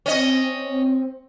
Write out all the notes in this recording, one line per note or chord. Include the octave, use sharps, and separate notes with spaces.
C4 C#4 D#5